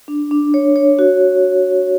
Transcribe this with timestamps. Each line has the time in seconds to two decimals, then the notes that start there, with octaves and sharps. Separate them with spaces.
0.08 D4
0.31 D4
0.54 C#5
0.76 C#5
0.99 F#4